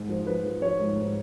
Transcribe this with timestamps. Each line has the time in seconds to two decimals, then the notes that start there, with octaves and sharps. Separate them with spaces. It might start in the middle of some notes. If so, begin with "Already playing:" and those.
Already playing: G#2
0.09 F3
0.27 F3 B4
0.45 F3
0.61 F3 C#5
0.79 G#2
0.96 G#2